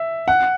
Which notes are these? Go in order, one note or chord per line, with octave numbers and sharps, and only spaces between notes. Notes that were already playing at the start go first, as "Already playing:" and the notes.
Already playing: E5
F#5